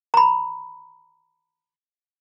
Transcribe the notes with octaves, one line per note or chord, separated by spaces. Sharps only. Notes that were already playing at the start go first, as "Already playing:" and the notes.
A#5 B5